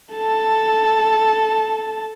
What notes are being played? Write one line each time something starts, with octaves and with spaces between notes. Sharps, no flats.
A4 A5